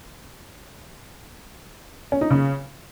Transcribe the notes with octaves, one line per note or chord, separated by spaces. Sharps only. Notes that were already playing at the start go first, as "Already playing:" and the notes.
C#4
D#4
C#3